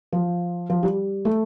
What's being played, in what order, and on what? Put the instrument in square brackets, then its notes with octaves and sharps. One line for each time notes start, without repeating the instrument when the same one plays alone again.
[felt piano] F3
F3
G3
A3